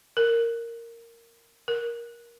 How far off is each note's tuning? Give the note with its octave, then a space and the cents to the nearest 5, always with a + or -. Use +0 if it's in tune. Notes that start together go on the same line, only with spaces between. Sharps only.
A#4 -10
A#4 +15